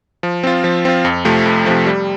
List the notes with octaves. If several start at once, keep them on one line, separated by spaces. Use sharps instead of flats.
F3
C4 F4
F3
C4 F4
F2
C3 F3 A3
F2
C3 F3 A3
G3